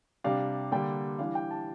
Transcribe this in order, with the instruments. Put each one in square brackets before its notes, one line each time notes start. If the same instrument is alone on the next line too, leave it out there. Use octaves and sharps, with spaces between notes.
[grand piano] C3 G3 D4 F5
D3 G3 A#3 D4 G5
E3 G3 D4 F5
G5
A5